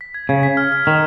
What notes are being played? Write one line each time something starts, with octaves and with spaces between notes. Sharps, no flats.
B6
G#6
C#3 G#6
B6
F6
F6
D#3 F6